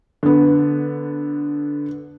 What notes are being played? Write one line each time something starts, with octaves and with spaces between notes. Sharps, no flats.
D3 B3